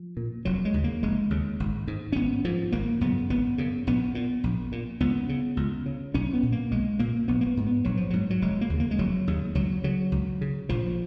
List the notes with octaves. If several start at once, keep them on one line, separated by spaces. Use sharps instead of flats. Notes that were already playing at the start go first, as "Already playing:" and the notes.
Already playing: F3
A#2
F1 F#3
G#3
D#2 C#3
A#3
F1 G#3
D#2 C#3
G#1
G#2
C#4
G#1 B3
G#2 F3
G#1 A#3
F#2 C#3 B3
G#1 B3
F#2 C#3
A#1 B3
A#2
A#1
A#2
C#2 B3
C#3
C#2
C#3
B1 C#4
B3
A#2
A#3
B1 G#3
A#2 A#3
A#1 B3
A#3
B3
G#2
B3
A#1 F#3
F3
G#2 F#3
F#3
F1 G#3
A#3
D#2 C#3
A#3
G#3
F1 F#3
D#2 C#3
C#2 F#3
C#3 F#3
C#2
C#3
A#1 F3